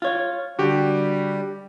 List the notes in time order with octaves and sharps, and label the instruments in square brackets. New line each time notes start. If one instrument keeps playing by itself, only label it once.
[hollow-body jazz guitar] F4 C#5
[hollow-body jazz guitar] D3 [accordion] G3 [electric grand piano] F#4 G4